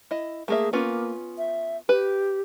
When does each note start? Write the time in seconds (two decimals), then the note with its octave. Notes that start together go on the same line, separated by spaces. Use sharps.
0.11 E4 D#5
0.48 A3 A#3 G#4 E5
0.73 A#3 B3 C#4 F4
1.38 E5
1.89 G4 B4